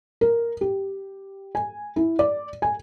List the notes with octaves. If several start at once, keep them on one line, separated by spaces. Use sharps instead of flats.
A#4
G4
G#5
E4
D5
G#5